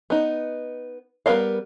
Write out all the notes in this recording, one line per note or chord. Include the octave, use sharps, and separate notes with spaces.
B3 D#4
G3 B3 A#4 D#5 F5